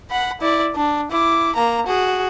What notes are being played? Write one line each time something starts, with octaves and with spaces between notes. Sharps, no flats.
F#5 B5
E4 D5
D4
E4 D6
A#3 A#5
F#4 G#4